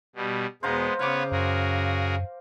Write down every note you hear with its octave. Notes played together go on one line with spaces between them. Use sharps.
B2 G3
E2 B2 G#3 B3 G#4 C5 F5 A#5
C#3 B3 B4 C#5 F5 D6
F#2 F#4 G#4 A#4